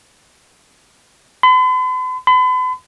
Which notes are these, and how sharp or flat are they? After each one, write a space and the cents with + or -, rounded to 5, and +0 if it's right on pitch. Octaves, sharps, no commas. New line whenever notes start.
B5 +45
B5 +40